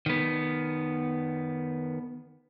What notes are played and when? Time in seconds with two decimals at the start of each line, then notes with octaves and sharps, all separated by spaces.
0.06 D#3 B3